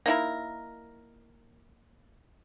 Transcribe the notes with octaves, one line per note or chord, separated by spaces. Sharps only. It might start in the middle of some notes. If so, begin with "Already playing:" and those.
A#3 D#4 E4 A#4